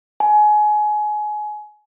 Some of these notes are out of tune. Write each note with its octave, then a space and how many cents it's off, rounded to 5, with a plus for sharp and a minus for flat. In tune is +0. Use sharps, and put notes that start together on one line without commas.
G#5 +25